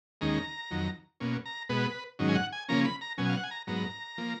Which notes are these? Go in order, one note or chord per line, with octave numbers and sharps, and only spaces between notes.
D#2 D#3 G#3 C#4 A#5
F2 D#3 F#3
B2 A#3 C#4
A#5
B2 G#3 B3 B4
G#2 D#3 F#3 C#4
G#5
F#5
G#5
C#3 F3 A#3 C#4 A#5
B5
A#5
B2 F#3 C#4 G#5
F5
F#5
G#5
A#5
G#2 F#3 B3 A#5
F3 A#3